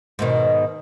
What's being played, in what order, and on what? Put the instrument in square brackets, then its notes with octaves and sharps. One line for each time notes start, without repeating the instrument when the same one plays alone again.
[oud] G#2 B2 D#3